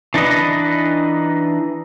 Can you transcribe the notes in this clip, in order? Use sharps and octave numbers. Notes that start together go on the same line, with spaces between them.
E3 D4 D#4 F#4 B4 D#5